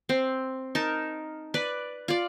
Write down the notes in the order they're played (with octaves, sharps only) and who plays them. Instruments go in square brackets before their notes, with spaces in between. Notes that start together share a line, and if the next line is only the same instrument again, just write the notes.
[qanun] C4
D#4 A#4 A5
B4 D5
F4 D5